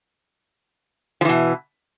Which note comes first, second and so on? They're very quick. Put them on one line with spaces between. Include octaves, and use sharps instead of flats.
F3 E3 B2